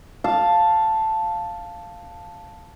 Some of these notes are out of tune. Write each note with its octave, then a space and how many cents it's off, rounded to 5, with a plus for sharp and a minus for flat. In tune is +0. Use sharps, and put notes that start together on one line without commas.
F5 +0 A5 +0